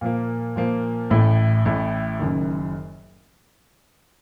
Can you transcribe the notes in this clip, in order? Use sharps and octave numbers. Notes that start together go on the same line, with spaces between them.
A#2 F3 A#3
A#2 F3 A#3
A1 A2 A3
A1 A2 A3
F#1 F#2 D#3